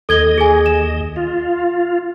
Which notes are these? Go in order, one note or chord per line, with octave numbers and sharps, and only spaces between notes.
D#2 A4 D#5 G#6 G7
G#4 G#5
E7
F4